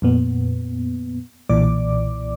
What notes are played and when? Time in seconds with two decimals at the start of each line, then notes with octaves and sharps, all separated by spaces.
0.02 F2 A#2 B3
1.49 B1 A#2 E3 D5 D6